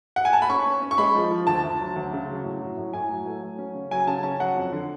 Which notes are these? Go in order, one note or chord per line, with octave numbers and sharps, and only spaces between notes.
F#5
G#5
A5
B5
C#4 C#6
C#4
C#4
C#6
G#3 B5
F3
F3
D2 A5
D2
F#3
D2
C#3
F#3
A2
F#3
A2
A2 G#5
F#3
A3
F#3
C#4
C#3
F#3 G#5
C#3 A5
C#4 A5
F#3 F#5
F2
D3